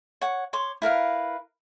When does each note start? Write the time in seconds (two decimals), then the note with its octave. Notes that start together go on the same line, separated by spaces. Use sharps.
0.21 C#5 F#5
0.53 C#5 C6 D6
0.82 E4 A#4 B4 F5